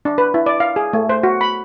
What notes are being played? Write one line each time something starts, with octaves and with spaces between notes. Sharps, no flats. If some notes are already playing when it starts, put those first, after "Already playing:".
D4
B4
E4
D5
F5
G#4
A3
C5
F#4
B5